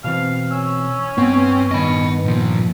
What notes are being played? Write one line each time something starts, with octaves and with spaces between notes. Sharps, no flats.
B2 E3 C4 F5
C#4 E6
G2 B3 C4
G2 D#3 D#5 B5
A#2 F3